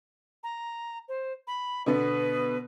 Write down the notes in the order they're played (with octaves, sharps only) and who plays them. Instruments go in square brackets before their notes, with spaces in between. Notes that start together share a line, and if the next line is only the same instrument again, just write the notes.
[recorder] A#5
C5
B5
[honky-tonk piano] B2 D3 B3 [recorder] B4